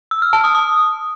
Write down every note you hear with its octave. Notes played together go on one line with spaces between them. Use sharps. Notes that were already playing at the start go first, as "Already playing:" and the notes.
E6
F6
A5
D#6
D#6